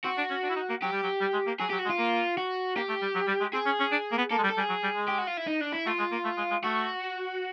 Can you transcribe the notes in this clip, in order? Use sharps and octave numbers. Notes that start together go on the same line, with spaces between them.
C4 F#4
D4
C#4
D4
E4
D#4
A#3
F#3 G4
G3
F#3
G3
G#3
A#3
F#3 G#4
F#3 G4
F#4
G#3
F4
A#3
F#4
A#3 G4
A3
G3
F#3
G3
G#3
C4 G#4
C#4
C#4
D4
A#3
B3
A#3 A4
G#3
G3
A4
G3 G#4
F#3
G3
G#3
G4
F#4
F4
E4
D#4
D4
E4
A3 F4
G#3
A#3
A3
G#3
G#3
A3 F#4